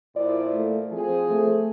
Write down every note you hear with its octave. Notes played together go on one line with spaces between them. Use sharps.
A#2 F3 E4 D5
A3
F3 C4 G#4
A3